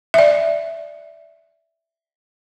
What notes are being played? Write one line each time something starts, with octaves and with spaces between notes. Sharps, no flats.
D5 E5